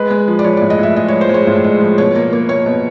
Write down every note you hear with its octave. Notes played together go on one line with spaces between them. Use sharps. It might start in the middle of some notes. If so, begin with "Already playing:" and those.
Already playing: G#3 B4
G#3
F3
D5
F3 C#5
D5
A2
D#5
A2 E5
G#3 D#5
C#5
F3
C5
G#3 C#5
A2
G#3
F3
B2 C#5
A#3
A#3
A#3 C#5
B2